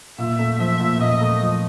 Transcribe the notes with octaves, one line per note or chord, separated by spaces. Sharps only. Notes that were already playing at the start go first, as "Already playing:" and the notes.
A#2 E5
A3
F3 E5
A#2
A#2 D#5
A3
F3